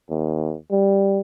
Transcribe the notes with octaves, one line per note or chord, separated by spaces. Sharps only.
D#2
G3